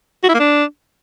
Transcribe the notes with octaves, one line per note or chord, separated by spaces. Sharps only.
F#4
E4
A#3
D4